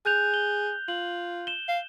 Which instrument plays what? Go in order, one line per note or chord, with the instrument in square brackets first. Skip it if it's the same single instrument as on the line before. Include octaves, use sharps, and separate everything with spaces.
[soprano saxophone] G#4 [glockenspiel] F#6 G6 F7
[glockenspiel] G7
[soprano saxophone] F4 [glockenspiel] F#7
[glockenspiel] E7 G7
[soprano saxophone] F5